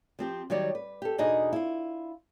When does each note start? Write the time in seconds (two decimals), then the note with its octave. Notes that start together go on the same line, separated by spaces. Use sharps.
0.19 F3 C4 G4
0.50 D#3 F#3 G3 C#5 D5
0.75 B4
1.02 G4 A4
1.18 E2 B2 D4 D#4 G#4 D#5
1.53 E4 F4